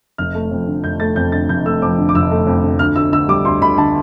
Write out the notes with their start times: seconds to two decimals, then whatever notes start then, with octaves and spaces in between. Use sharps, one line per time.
0.18 F1 F6
0.35 A3
0.51 F2
0.67 D3
0.84 F1 G6
1.00 A3 A6
1.16 F2 G6
1.32 D3 A6
1.49 F1 G6
1.66 A3 E6
1.82 F2 D6
1.98 D3
2.09 D6
2.15 F1 E6
2.31 A3
2.47 F2
2.63 D3
2.79 D2 F6
2.96 D2 E6
3.12 D3 E6
3.28 G3 D6
3.45 D2 C6
3.61 D2 B5
3.78 D3 A5